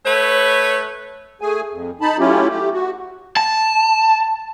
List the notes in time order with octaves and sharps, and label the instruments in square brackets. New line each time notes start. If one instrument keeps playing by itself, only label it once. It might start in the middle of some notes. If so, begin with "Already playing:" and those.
[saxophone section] A3 B4 C#5
[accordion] A3 G#4 G#5
F2
D#4 A5 B5
F#3 A3 C#4 E4 F4 G4
A3 G4
F#4
[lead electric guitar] A5